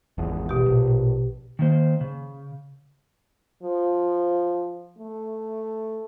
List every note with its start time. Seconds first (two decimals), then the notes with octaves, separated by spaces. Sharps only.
0.18 G#1 E2
0.49 B2 G4
0.66 A#1
1.59 D#3 A#3 C5
2.01 C#3
3.63 F3
4.99 A3